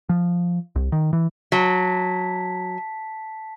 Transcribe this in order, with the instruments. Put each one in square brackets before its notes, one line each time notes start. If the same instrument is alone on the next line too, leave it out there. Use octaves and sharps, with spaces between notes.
[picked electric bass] F3
C2
D#3
E3
[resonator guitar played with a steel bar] F#3 [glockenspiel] A5 B6